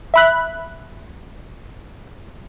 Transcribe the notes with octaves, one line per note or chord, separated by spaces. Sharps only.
E5 B5 F#6